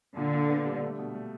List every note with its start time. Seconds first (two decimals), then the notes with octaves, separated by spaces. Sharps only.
0.17 A#2 D3
0.33 A#2
0.49 B3
0.66 G3
0.82 A3
0.98 B2
1.15 A3